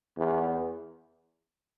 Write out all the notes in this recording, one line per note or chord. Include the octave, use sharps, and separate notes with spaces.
E2